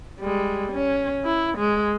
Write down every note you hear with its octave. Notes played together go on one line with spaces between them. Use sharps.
G3 G#3
C#4
E4
G#3